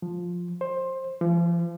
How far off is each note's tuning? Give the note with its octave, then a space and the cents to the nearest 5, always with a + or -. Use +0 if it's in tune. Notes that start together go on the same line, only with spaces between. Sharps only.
F3 +5
C5 +15
F3 -40